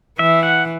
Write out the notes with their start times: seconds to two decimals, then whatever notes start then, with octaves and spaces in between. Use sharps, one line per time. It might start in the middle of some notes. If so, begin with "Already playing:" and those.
0.19 E3 E5
0.43 F#5